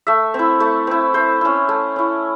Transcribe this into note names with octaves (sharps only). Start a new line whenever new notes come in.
A3 E5
C4
E4
A3
C4 E4
A3 C5
C#4 E4
A3
C#4 E4